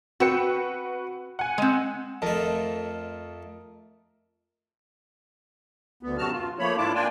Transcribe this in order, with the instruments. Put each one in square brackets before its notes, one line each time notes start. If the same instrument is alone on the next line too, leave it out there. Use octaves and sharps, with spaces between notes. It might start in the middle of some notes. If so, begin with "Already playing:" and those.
[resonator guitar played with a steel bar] C4 G5 [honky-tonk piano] F#4 B4 C#7
[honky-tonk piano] F#5 G#5
[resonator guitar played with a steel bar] G#3 C4
[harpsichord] F2 A3 [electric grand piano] A#4 D#5 A5
[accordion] D2 B3
F#2 C3 F#3 F#4 A5 F6
F4
F3 A3 A#3 C#5 B5
G#2 D4 E4 F4 A5 D6
A#3 D4 F4 D5 G5 G#5